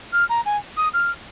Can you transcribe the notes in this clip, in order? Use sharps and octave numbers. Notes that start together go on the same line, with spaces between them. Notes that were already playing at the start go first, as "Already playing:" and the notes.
F6
A#5
G#5
D#6
F6